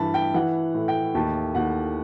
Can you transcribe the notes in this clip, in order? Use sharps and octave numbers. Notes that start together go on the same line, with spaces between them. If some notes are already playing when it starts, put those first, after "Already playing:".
Already playing: G2 E3 A5 B5
G5
E3 F#5
A2
G5
D#2 A5
D#2 F#5